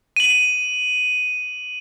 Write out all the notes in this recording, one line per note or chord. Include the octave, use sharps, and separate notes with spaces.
D#7 F#7